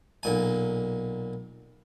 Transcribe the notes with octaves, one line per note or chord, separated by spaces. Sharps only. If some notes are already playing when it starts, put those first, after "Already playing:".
B1 A#2 G#5